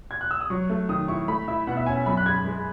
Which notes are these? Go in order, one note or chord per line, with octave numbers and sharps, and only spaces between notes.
G#6
F#6
E6
D#6
F#3 C#6
A3
D#3 D#6
E4 C#6
A3 B5
E4 E5
B2 F#5
E5
C#4 G#5
F#2 B5
F#6
G#3 G#6
G#3